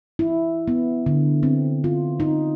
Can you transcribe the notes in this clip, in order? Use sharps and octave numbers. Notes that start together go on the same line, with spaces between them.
E4
B3
D3
C4
F4
D#4